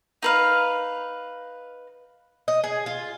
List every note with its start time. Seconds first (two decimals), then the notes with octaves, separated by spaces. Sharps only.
0.22 D#4 B4 F5
2.48 D#5
2.64 G#4
2.86 F4